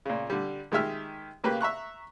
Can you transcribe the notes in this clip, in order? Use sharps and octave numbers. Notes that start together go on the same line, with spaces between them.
A#2 C#3
D3 G3
D#3 G#3 G4 E5 F6
C#3 A#3 G4 B4
E5 A#5 C#6 F#6